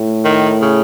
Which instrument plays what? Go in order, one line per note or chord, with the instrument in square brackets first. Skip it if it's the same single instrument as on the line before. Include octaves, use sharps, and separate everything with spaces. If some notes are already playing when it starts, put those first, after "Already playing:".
Already playing: [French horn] A2
[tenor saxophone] D#3
C#3